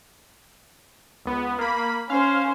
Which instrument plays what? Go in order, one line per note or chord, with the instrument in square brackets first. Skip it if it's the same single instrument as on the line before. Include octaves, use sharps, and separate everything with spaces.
[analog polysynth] C#2 B3
A#3 B5
[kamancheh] C#4 C5 [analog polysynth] F5